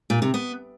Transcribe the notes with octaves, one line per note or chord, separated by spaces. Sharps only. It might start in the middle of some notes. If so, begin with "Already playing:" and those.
A#2
C3
B3